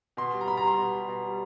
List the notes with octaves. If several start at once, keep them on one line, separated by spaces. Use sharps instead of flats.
B2 C6
G3
A#5
B2 B5
A#5
G3 C6
B2
G3
B2
G3